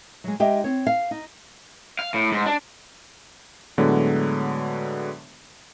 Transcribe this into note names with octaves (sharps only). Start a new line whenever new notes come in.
F#3 G#3
G#3 D#4 G4 D#5 E5 G5
C4 C#5
F5
D#4
F5
A2
G#2
D4
A2 D3 F#3 G#3 B3